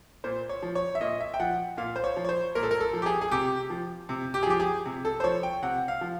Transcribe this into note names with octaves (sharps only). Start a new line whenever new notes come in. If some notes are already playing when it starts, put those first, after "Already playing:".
A#2 C5
C#5
F3
C#5
E5
A#2 D#5
E5
G5
F3 F#5
A#2 F5
C5
C#5
F3
C#5
C5
A#2 A#4
A4
A#4
A4
F3
G4
G#4
G#4
C3 G4
F3
C3
G4
G#4
F3 G4
G#4
C3
A4
C5
F3 C#5
G5
C3 F#5
F5
F3